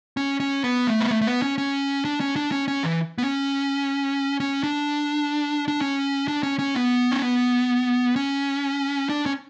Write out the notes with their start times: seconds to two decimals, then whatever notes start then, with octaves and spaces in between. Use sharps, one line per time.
0.17 C#4
0.40 C#4
0.64 B3
0.87 A3
1.00 B3
1.11 A3
1.22 A3
1.27 B3
1.42 C#4
1.58 C#4
2.05 D4
2.20 C#4
2.36 D4
2.52 C#4
2.68 C#4
2.83 E3
3.18 B3
3.23 C#4
4.40 C#4
4.63 D4
5.68 D4
5.81 C#4
6.28 D4
6.43 C#4
6.59 C#4
6.75 B3
7.11 C#4
7.22 B3
8.16 C#4
9.09 D4
9.26 C#4